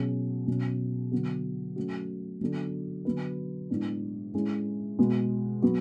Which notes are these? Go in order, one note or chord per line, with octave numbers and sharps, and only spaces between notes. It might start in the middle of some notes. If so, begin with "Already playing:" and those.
Already playing: B2 F#3 C#4 G#4
B2 F#3 C#4
D3 F#3 B3 F#4
F#3 A3 C#4 F#4
D3 F#3 B3 D4 A4
D3 F#3 B3 F#4 B4
A2 G#3 B3 D4
A2 G#3 C#4 G#4
B2 G#3 B3 F#4
F#3 B3 F#4